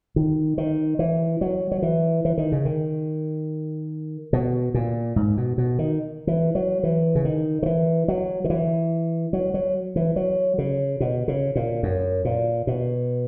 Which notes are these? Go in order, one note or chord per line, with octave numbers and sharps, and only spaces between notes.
D#3
D#3
E3
F#3
F#3
E3
E3
D#3
C#3
D#3
B2
A#2
G#2
B2
B2
D#3
E3
F#3
E3
C#3
D#3
D#3
E3
F#3
D#3
E3
F#3
F#3
E3
F#3
C#3
B2
C#3
A#2
F#2
A#2
B2